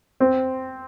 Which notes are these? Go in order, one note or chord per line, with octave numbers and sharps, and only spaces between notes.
C4